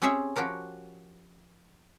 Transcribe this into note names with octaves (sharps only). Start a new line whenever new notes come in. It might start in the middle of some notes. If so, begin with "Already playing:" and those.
C4 C#4 G4 G#4 C#5 E5
F3 F#4 G4 A#4 C#5